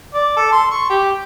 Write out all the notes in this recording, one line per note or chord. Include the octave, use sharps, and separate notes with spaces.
D5
A4
C6
C#6
G4